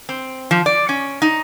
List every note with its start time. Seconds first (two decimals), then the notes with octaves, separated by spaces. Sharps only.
0.09 C4
0.51 F3
0.66 D5
0.89 C#4
1.22 D#4